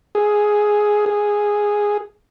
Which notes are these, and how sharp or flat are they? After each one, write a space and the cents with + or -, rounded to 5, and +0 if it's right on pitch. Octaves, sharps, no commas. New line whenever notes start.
G#4 +5
G#4 -5